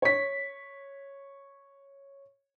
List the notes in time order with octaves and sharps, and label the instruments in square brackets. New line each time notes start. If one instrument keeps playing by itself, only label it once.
[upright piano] C#5 B6